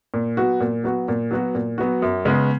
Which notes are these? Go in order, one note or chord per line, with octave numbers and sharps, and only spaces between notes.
A#2
F#3 B3 F#4
A#2
F#3 B3 F#4
A#2
F#3 B3 F#4
A#2
F#3 B3 F#4
F#2
C#3 G#3 B3